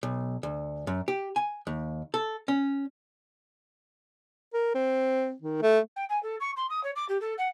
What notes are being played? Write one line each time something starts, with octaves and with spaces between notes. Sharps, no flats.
B1
D2
F#2
G4
G#5
D#2
A4
C#4
A#4
C4
D#3
A3
G5
G#5
A4
C#6
C6
D#6
C#5
D6
G4
A4
F#5